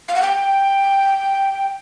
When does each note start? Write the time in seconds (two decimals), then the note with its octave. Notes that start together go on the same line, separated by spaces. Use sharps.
0.08 F5
0.15 F#5
0.22 G5